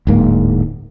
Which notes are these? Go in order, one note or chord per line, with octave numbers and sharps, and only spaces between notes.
D1 G#2 A#3